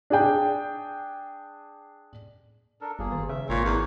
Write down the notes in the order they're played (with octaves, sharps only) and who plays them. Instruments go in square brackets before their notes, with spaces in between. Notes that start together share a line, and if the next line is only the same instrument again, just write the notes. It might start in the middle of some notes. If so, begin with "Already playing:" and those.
[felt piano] D4 G#4 G5
[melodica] D4 A4 A#4
[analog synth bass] G1 [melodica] A#3 G#4
[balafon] D#3
[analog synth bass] C#3 [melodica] E5
[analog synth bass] G#1 [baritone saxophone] A#2 [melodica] A#3 C#5
[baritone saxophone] E2